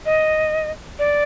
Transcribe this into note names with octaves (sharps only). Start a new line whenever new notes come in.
D#5
D5